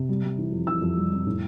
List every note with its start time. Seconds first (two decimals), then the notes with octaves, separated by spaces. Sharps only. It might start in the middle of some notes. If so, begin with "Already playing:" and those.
Already playing: C3
0.09 G3
0.24 G3
0.38 E3
0.52 F2
0.67 E3 E6
0.82 F2
0.97 G3
1.12 F2
1.27 A2